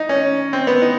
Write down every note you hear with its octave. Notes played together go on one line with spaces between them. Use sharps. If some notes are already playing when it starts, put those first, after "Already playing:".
Already playing: D#4
C#4
C4
B3
D#4